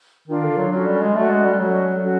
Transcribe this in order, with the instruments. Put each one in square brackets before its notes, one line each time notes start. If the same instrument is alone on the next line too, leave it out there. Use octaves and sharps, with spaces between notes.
[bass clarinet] D#3 [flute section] D4 F4 A#4
[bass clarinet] D3
F#3
[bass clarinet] F#3 [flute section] C#4 F#4 A4
[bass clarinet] G3
G#3
[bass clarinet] A3 [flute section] C#4 F#4 A4
[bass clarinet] G#3
G3
[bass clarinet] F#3 [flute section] C#4 F#4 A4
[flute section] C#4 F#4 A4